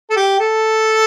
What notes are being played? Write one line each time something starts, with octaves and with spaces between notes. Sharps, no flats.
A4
G4
A4